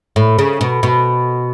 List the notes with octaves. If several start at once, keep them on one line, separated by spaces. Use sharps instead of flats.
A2
C#3
B2
B2